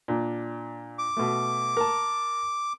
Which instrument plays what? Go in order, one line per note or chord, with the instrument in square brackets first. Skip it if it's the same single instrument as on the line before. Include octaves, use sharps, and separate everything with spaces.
[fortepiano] A#2 D4
[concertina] D6
[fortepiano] B2 A3
A#4 A5